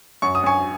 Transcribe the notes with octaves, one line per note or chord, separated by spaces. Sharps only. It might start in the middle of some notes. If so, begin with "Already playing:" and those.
F#2 C#6
D#6
F#2 G#5 C#6